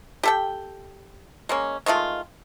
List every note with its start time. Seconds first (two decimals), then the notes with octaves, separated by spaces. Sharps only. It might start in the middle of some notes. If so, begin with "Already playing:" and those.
0.23 G4 A4 G5
1.49 G#3 A#3 C#4
1.86 D#3 G#3 A3 F4